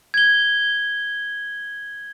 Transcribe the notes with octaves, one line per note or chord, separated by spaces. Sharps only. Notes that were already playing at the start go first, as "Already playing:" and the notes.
G#6 G7